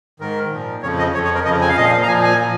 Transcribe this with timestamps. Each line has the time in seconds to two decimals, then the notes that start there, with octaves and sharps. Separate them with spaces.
0.20 G#2 D#3 A#4
0.51 A#2 F3
0.83 F2 C#3 F3 C#5
0.98 D#5
1.14 F2 F3 C#5
1.25 C#5
1.35 A#4
1.45 F2 C#3 F3 D#5
1.61 G#5
1.69 F5
1.77 A#2 F3 D#5
1.84 F5
2.02 A#5
2.08 A#2 F3 G#5
2.24 G#5
2.39 A#2 F3